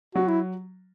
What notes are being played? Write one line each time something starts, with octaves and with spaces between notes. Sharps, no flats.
F#3 F#4
E4